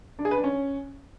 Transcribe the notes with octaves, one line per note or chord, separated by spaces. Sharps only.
D4
G#4
B4
D4
C#4